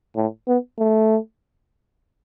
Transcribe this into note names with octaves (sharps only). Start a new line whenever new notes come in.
A2
B3
A3